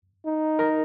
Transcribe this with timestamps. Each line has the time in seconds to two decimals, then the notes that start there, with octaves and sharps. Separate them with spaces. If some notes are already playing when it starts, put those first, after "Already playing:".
0.26 D#4
0.59 A#4 A#5